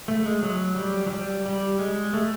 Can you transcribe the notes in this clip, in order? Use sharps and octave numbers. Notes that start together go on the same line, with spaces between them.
A3
G#3
F#3
G3
F#3
G3
G3
G#3
A3